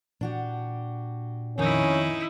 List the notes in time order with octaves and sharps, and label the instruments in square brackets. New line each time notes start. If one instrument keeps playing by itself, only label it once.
[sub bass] A#2 [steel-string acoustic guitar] D4 F#4 G4
[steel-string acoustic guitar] F2 D#3 [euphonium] C#4 [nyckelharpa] D#4 E4